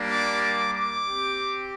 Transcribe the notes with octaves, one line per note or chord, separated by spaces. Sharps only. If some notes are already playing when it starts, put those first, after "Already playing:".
Already playing: G3 A#3 D4
D6
D6
D6
C4 G4